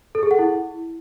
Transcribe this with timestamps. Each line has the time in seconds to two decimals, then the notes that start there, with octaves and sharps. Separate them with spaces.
0.15 A4
0.23 G#4
0.31 F#5
0.39 E4